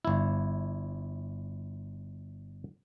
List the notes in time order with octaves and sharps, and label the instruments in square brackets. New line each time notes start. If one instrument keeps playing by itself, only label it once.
[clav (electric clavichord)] G1 E4